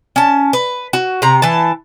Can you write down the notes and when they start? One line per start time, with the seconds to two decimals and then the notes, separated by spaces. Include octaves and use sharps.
0.16 C#4 A5
0.53 B4
0.93 F#4
1.22 C3 A#5
1.42 E3 A5